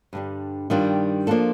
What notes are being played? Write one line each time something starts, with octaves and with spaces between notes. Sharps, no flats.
G2 D3 G3
G2 D#3 G3 D4 F4
F3 A#3 D4 F4 A4